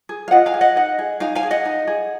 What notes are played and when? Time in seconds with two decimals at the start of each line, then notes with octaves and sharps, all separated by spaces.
0.09 G#4
0.28 F5
0.31 F4 D#5 F#5
0.46 F5 G#5
0.54 G#4
0.61 D#5 F#5
0.76 D#4 D#5 F#5
0.99 G#4
1.20 D#4 F5 G#5
1.35 F5 G#5
1.43 G#4
1.51 D#5 F#5
1.65 D#4
1.87 G#4